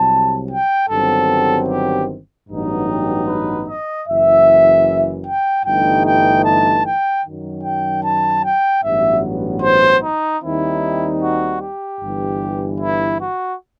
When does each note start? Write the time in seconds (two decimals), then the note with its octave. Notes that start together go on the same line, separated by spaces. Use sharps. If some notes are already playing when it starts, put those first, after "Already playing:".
Already playing: C2 C3 F#3 A5
0.50 G5
0.90 G1 G2 D#3 F#3 C4 A4
1.69 G4
2.49 A1 G2 F#3 B3 D#4
2.88 G4
3.28 B4
3.67 D#5
4.07 F#1 F#2 E3 E5
5.26 G5
5.65 G1 G2 E3 A3 D#4 G5
6.05 G5
6.45 A5
6.85 G5
7.25 F#2 D#3 F#3
7.64 G5
8.04 A5
8.44 G5
8.83 A1 G2 F#3 B3 E5
9.62 C5
10.02 D#4
10.42 D#2 D#3 G3 C4 D#4 E4
11.22 F#4
11.61 G4
12.01 G1 G2 E3
12.80 E4
13.20 F#4